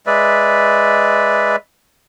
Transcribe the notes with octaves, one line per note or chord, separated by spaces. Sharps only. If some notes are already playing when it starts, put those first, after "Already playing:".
G#3 B4 D5 E5